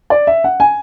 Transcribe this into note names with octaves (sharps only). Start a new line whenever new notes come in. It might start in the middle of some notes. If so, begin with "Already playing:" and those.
D5
E5
F#5
G#5